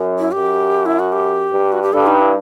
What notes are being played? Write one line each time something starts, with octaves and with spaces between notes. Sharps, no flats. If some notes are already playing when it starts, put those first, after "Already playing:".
Already playing: F#2
E4
F#2 G4
E4
F#4
G4
G2
F#4
G4
G2 A4
D#4
E4